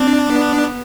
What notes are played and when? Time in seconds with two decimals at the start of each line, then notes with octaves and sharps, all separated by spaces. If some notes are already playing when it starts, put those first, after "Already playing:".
Already playing: C4 D4
0.29 B3